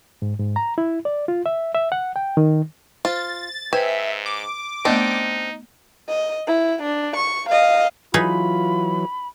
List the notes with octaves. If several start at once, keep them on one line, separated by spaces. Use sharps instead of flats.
G#2
G#2
A#5
E4
D5
F4
E5
E5
F#5
G5
D#3
F4 C5 A6
G#2 B4 C5 E5 G5 G#5
D6
A3 B3 C4 D4 D#4 D#5
D#5
E4
D4
C#6
D#5 F5
E3 F#3 D#4 F4 G#4 B4 B5